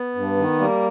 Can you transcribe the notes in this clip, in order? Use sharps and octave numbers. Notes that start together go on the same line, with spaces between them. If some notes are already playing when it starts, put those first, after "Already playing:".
Already playing: B3
G2
D#3
G3 A#3